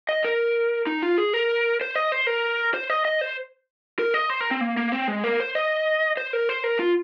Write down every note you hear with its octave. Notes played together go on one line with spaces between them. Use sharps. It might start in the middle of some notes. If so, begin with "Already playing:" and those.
D#5
A#4
D#4
F4
G#4
A#4
C5
D#5
C5
A#4
C5
D#5
D#5
C5
A#4
D#5
C5
A#4
C4
A#3
A#3
C4
G#3
A#3
C5
D#5
C5
A#4
C5
A#4
F4